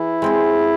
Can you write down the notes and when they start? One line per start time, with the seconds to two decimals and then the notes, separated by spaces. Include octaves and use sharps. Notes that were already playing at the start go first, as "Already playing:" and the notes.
Already playing: E3 E4 G#4
0.22 G#3 C4 G#4